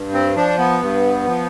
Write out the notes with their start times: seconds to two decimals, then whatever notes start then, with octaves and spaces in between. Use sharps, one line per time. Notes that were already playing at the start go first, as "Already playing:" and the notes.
Already playing: G2
0.13 C4
0.36 F3 D4
0.58 B3
0.81 G2
1.26 F3